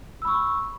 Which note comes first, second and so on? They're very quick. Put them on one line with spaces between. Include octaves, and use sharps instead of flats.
E6 B5 C#6